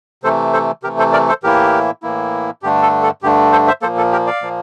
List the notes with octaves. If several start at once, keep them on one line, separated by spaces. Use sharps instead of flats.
C3 E3 A3 A4 C5
A4 C5
C3 E3 A3 G4 A#4
A4 C5
A#4 D5
A4 C5
A2 E3 A#3 E4 G4 A#4
A2 E3 A#3 E4
G2 D3 A3 D4 G4
A4
A4
G2 D3 A3 D4 G4
A4 C5
C5 E5
A#2 F3 A#3 A4 C5
A4
G4 A#4
D5 F5
A#2 F3 A#3